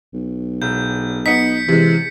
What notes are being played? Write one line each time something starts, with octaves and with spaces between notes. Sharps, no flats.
B1
E1 G6
B3 D#4 B6 C#7
C3 E3 G#3